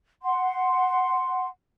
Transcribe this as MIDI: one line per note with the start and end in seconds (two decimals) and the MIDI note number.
0.23 1.47 78
0.23 1.47 84